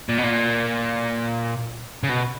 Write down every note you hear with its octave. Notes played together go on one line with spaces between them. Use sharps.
A#2
B2
A#2
C#3
B2